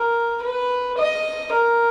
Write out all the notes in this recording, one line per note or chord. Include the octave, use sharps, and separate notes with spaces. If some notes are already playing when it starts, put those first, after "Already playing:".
Already playing: A#4
B4
D#5
A#4